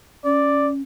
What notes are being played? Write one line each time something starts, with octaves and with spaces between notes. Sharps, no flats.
C#4 D5